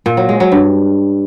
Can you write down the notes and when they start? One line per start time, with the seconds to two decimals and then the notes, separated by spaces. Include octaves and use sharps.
0.06 A#2
0.17 F#3
0.29 G#3
0.40 F#3
0.52 G2